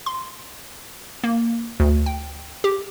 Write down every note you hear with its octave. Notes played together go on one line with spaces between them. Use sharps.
C6
A#3
D2
G5
G4